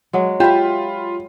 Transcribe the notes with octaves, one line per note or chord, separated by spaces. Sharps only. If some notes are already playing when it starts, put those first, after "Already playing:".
F#3 G#3
F4 G4 E5 B5